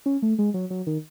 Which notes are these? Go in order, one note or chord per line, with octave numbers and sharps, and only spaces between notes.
C#4
A3
G#3
F#3
F#3
D#3